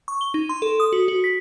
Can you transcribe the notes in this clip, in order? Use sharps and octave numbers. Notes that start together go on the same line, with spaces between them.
C#6
G7
D#4
C6
A4
D#6
F#4
F#4
B6